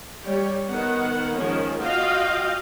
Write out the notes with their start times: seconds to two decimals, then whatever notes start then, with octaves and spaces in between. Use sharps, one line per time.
0.23 G3 G4 C#5
0.69 D#3 B3 F#5
1.34 D#3 F3 G#3 C#4
1.78 F4 F#4 D#5 F5 G5